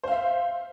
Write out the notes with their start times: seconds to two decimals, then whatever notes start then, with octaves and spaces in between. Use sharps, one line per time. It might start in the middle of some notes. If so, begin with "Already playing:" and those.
0.03 C5
0.08 F5
0.12 E5